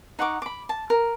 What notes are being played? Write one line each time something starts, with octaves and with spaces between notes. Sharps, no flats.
D#4 F#5 C#6 D6
B5 D6
A5
A#4